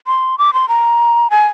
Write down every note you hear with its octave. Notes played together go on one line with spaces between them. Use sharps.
C6
D6
C6
A#5
G#5